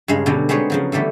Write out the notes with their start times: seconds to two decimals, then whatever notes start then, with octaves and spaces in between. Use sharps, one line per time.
0.08 G2 C#3 G#3 F5
0.26 B2 D3 F#3 G3 C#4
0.49 G#3 B3 C4 D#4 C5 C#5
0.70 C#3 F3 F#3
0.92 D3 E3 G3 A3 B3